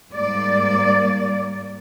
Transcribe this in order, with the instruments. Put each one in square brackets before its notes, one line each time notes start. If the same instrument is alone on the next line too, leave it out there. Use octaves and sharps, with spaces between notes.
[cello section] G#2 G3 A#3 D5